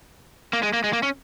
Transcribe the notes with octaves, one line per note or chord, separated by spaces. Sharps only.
A#3
G#3
A#3
G#3
A#3
C#4